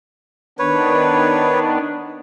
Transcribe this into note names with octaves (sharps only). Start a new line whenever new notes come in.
D#3 B3 D4 B4 C#5